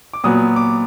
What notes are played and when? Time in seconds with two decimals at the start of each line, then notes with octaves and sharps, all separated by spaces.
0.13 D6
0.24 A#2 F#3 B3 D#6
0.56 D6